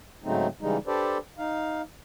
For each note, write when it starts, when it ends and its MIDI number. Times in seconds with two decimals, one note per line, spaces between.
0.24 0.47 44
0.24 0.47 49
0.24 0.47 54
0.24 0.47 57
0.24 0.47 60
0.24 0.47 63
0.61 0.77 49
0.61 0.77 52
0.61 0.77 55
0.61 0.77 56
0.61 0.77 63
0.87 1.18 62
0.87 1.18 67
0.87 1.18 69
0.87 1.18 71
0.87 1.18 72
0.87 1.18 74
1.38 1.82 63
1.38 1.82 77